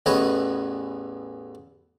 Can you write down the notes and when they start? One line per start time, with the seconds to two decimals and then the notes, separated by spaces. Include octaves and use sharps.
0.06 A1 E2 B3 C#5 D#5